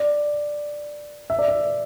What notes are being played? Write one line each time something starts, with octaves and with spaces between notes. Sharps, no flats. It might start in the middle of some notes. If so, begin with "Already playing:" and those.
Already playing: D5
E5
D5
E5